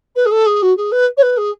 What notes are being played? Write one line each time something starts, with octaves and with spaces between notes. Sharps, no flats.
B4
G#4
A4
G#4
F#4
G#4
B4
C#5
B4
G#4